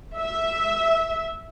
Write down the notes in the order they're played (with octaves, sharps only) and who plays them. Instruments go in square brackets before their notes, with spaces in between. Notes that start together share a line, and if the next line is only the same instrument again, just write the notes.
[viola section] E5